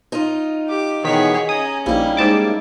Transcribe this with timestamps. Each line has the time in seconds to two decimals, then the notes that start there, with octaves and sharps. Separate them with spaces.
0.12 D#4 F4
0.67 G4 D6
1.04 B2 D#3 E3 B3 G#4 C#5 B6
1.49 C#4 G#5 A#5 D#6
1.86 A#1 G3 A#3 D#4 E4
2.17 G#2 A5 D6